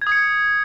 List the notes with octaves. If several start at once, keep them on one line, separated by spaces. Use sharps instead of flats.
G#6
D#6
C#7